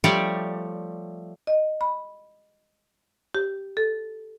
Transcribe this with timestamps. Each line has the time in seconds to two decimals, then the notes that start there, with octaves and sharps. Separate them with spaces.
0.04 F3 G3 A3 G4 C#5 D5
1.47 D#5
1.81 B5
3.35 G4
3.77 A4